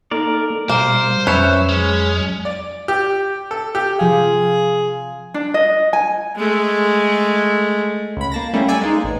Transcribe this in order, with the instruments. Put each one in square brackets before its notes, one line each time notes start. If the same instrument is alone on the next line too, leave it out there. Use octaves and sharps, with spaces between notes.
[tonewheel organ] A#3 D#4 A4 [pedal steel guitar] A#4 D5
[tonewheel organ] B2 G3 [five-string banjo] A#3 [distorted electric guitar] C5
[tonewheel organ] F2 F#3 [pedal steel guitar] C#4 C#5 E5 [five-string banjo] B4
[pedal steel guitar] G#3 [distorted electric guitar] C#4
[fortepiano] D5
G4
A4
G4
[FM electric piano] C3 F3 F5 [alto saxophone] G#4
[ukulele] D4
D#5
G#5
[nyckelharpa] G#3 A3
[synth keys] C#2 B5
A#3 A5 A#6
G3 A3 A#3 C#4 E4
D5 G#5 E6
G#3 A#3 D#4
A1